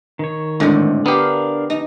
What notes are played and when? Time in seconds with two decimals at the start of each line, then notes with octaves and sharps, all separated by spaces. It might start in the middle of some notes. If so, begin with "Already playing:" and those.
0.19 D#3 C#5
0.60 G#1 A2 D3 C5
1.06 B3 D4 G4 A#4 F5
1.70 D#4